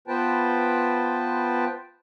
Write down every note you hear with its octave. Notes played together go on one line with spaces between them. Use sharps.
B3 F4 B4 C5 G5 A5